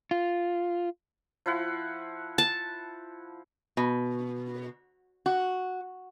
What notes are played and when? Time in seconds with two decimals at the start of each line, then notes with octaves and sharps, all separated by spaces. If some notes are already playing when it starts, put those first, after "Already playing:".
0.11 F4
1.46 F3 E4 F#5
2.38 A5
3.77 B2
5.26 F#4